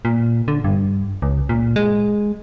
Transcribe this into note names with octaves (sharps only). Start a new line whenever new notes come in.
A#2
D3
G2
C#2
A#2
G#3